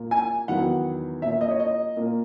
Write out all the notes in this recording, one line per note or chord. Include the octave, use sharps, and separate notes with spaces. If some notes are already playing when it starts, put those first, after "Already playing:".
Already playing: A#2 A#3
G#5
E2 D#3 F#3 B3 F#5
A#2 A#3 E5
D#5
C#5
D#5
A#2 A#3